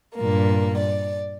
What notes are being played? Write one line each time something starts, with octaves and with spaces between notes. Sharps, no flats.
G2 A#2 A#3
D5